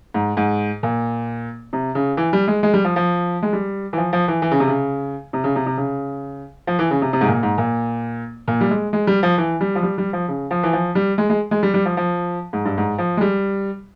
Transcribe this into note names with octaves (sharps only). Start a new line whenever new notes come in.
G#2
G#2
A#2
C3
C#3
E3
G3
G#3
G#3
G3
F3
F3
G#3
G3
E3
F3
F3
E3
E3
C#3
C3
C#3
C3
C#3
C3
C3
C#3
F3
E3
C#3
C3
C3
G#2
A#2
G#2
A#2
A#2
G3
G#3
G#3
G3
F3
E3
G3
F3
G3
G3
F3
C#3
F3
E3
F3
G3
G#3
G#3
G#3
G3
G3
F3
F3
G#2
G2
G#2
F3
G#3
G3